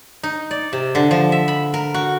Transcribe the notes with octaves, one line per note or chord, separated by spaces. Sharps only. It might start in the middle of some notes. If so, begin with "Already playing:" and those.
D#4
D5
C3
D3
F3
E5
B5
A#4
F#4